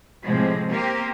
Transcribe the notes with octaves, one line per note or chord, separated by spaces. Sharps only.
A2 C3 F3 G#3
A#3 C4 G4 A#4